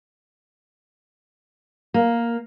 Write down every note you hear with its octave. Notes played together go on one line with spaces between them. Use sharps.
A#3